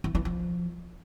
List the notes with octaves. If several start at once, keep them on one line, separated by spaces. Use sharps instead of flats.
E3
E3
F3